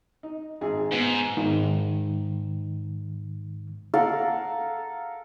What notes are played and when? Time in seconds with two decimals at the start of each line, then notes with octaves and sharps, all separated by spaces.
0.23 D#4
0.61 G#1 G#4
0.92 G#2 B3
1.37 G#2 D#3
3.94 A4 A#4 F5 F#5